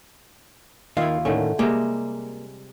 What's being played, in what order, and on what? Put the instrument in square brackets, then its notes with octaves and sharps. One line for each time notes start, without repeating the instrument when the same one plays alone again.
[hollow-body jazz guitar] D#2 F5 [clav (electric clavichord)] D#3 [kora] E4 F4
[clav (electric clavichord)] A2 D#3 C#4 [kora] D3 A3
[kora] C3 G3 G#3 [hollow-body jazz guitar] A#3 [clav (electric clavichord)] G#4